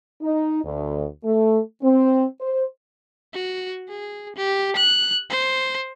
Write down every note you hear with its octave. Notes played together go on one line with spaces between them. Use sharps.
D#4
D2
A3
C4
C5
F#4
G#4
G4
F#6
C5